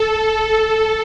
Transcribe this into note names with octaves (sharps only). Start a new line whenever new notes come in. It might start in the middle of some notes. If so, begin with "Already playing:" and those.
Already playing: A4
A4